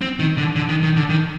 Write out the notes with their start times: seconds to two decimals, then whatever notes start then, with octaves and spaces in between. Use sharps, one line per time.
0.02 C4
0.19 D#3
0.38 D3
0.56 D3
0.69 D#3
0.83 D#3
0.97 D3
1.10 D#3